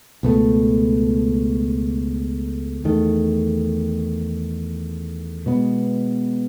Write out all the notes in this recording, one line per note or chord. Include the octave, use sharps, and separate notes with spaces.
C#2 B2 A3
E2 D#3 A3
B2 G#3 B3